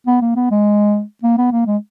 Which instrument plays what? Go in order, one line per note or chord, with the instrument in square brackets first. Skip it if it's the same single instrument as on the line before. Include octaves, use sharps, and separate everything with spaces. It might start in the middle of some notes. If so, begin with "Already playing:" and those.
[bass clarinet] B3
A#3
B3
G#3
A#3
B3
A#3
G#3